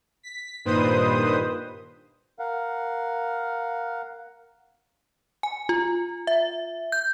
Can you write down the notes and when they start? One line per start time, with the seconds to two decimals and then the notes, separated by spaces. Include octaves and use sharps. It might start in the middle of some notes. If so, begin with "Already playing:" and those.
0.23 B6
0.65 G2 A#2 D#3 B4 C5 D#6
2.39 A#4 F5 F#5
5.43 G#5
5.69 F4
6.27 E5
6.92 G6